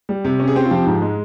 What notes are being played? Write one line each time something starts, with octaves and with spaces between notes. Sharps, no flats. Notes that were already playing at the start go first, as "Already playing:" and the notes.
G3
C3
C#4
G#4
C4 G4
F4
F3 G4
G#2
G#3